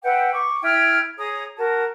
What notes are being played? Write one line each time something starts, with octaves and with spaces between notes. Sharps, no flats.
B4 E5 F#5 G5
C#6 D6
E4 G5 F6 G#6
G#4 C#5 A#5 D#6
F#4 A#4 A5